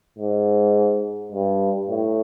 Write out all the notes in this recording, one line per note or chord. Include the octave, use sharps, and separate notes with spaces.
G#2
G2
A2